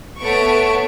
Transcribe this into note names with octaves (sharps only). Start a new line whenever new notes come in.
A3 B3 C#5 A5 C#6 D7